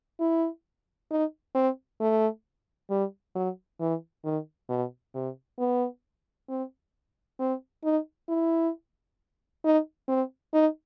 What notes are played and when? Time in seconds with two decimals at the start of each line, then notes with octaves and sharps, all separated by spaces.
0.20 E4
1.11 D#4
1.55 C4
2.00 A3
2.90 G3
3.35 F#3
3.80 E3
4.24 D#3
4.69 B2
5.15 C3
5.59 B3
6.49 C4
7.40 C4
7.84 D#4
8.28 E4
9.64 D#4
10.08 C4
10.53 D#4